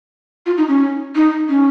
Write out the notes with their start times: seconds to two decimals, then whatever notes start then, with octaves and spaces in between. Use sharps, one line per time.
0.46 F4
0.58 D#4
0.68 C#4
1.15 D#4
1.49 C#4